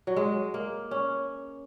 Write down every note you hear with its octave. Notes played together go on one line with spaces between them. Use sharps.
F#3
G#3
A#3
C#4